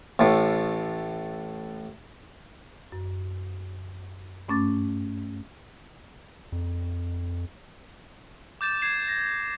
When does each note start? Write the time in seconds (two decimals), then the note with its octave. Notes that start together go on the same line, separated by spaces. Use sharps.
0.19 A1 A2
2.92 F#2
4.49 G2 A3 C#4 D6 A6
6.53 F2
8.61 D6 G6 A6 E7
8.82 G#6 C7 E7
9.08 A#6